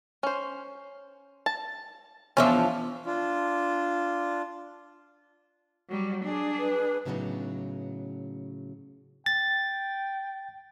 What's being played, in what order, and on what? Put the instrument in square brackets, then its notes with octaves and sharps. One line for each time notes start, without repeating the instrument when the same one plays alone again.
[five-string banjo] C#4 C5
A5
[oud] E2 F3 D4 [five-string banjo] C#4 F4 E5
[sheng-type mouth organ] D4 F4
[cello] F#3 G3
D4 G#4
[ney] B4
[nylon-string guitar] A2 C#3 F#3 G3 B3 D#4
[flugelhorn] G5 [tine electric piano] A6